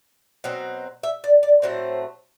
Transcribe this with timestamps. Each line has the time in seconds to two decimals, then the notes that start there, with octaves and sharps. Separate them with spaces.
0.44 B2 F#3 C4
1.03 E5
1.24 D5
1.43 D5
1.62 A2 F#3 A3 C4 C5